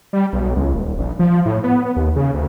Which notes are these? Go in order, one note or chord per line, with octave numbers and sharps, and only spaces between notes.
G3
B1
C#2
D#1
A#1
F3
A2
B3
D#2
C#3
D2